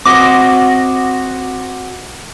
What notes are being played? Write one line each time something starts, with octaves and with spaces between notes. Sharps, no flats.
C4 F#4 D#5 D6